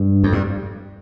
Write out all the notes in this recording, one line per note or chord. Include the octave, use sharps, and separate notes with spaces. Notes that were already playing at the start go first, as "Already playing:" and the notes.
Already playing: G2
F2
G2